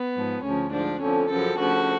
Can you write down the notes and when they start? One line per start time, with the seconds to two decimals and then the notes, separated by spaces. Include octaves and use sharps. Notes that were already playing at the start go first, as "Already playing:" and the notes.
Already playing: B3
0.15 G#2 F3
0.43 D2 C#3 F3 C#4
0.72 G#2 F3 D4
1.00 F2 D3 F3 C#4
1.30 F#2 C#3 F3 A4
1.58 D2 C#3 F3 F#4